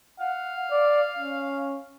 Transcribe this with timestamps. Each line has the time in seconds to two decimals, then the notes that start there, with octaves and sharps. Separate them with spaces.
0.20 F5 F#5
0.71 D5
1.19 C#4